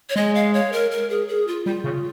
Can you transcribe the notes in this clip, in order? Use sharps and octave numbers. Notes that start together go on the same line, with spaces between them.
C#5
G#3 D#5
F5
C#5
A#4
A#4
G#4
G#4
F4
G3 F4
C#3